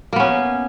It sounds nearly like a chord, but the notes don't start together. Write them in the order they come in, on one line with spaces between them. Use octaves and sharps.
A#3 B3 C#4